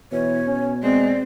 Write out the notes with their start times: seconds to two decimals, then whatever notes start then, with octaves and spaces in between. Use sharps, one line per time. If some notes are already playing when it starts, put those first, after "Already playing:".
0.12 B2 E3 C#5
0.47 C#4
0.83 G#3 C4 D5